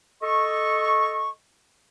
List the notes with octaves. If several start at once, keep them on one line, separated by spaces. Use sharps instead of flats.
A4 D#5 C#6